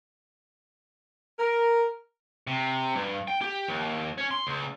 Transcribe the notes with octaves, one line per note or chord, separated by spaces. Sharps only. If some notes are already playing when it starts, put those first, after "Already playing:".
A#4
C3
G2
G5
G4
D#2
C#4
C6
C#2